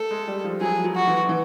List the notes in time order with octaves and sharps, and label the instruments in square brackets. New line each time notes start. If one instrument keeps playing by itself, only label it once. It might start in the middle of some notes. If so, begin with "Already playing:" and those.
Already playing: [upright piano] A3 [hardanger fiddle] A4
[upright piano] G#3
G3
F3
[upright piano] F#3 [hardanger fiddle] G#4
[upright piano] F#3
[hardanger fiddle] F#4
[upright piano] E3
E3